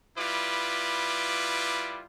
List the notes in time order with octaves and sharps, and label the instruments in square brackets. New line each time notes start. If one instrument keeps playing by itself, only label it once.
[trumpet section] G3 E4 F4 B4 D6